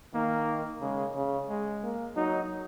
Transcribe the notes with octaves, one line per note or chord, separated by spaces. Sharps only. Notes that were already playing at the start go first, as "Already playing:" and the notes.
D#3 A#3
C#3 G#3
C#3
G#3
A#3
F#3 D#4